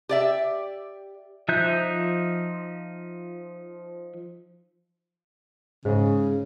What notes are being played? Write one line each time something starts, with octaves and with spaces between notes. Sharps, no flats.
G4 D5 E5
F3 D#4 E5 F#6 G6
G#2 C#3